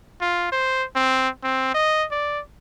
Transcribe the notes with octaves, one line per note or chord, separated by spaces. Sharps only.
F4
C5
C4
C4
D#5
D5